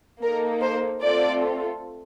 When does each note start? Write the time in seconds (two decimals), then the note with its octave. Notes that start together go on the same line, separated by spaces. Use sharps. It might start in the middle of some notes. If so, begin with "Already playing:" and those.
0.23 A#3 D#4 A4 A#4
0.62 C5
1.02 A3 C4 F4 A4 D5